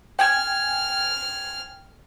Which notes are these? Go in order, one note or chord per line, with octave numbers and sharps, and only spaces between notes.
G5 G#5 F6 G#6